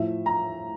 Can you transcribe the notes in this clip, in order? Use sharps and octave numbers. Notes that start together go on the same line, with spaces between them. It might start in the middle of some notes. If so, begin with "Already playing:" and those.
Already playing: A2 F3 E5
A#5